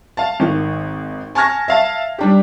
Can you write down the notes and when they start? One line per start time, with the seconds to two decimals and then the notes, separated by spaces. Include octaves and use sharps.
0.17 F5 A5
0.40 G#1 D#3
1.35 G#5 A5 C#6 F6 G#6 A#6
1.68 E5 F5 A5
2.18 G3 D4 G4